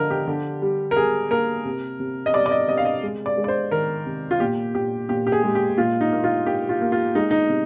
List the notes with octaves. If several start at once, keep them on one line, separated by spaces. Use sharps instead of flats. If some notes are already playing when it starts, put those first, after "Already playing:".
Already playing: D3 F3 A#4 D#5
G4
D3
G3
A#4
G3 G#4
A#3 A#4
C3
C3
D#5
G3 D5
D5
D#5
C3 D#5
F5
D#5
G#3
D5
G#3
D5
C5
D#3 A#4
C3
F4
A#2 G4
A#2 G4
A#2 G4
G4
G#4
G#3
G4
A#2 F4
D#4
A#3
F4
A#3 G4
F4
A#3
F4
G#3 D#4
D#4
C3